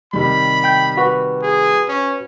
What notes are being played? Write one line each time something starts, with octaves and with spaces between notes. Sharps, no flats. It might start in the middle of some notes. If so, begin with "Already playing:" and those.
C3 D#3 G3 B5
G5 G6
F#4 B4
G#4
C#4